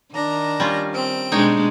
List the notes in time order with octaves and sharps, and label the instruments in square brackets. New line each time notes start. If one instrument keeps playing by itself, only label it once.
[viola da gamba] D#3 [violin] D4 A#5
[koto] G3 C#4 F4
[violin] C4 D7
[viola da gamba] B2 G#3 D4 [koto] D#4 C#5 G5